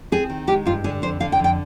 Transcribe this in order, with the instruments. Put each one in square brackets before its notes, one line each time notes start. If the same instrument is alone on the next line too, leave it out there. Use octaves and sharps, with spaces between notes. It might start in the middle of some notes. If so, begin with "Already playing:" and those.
[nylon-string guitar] C4 G#4
D#3
G#3 G4
G2 F4
D3 G#4
F2 C5
D3 F5
G5
F2
G5